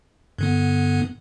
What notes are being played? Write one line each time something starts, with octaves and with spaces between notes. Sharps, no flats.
G2 D3 B3